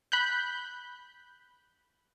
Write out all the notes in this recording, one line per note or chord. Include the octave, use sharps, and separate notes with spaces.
B5 F#6 G6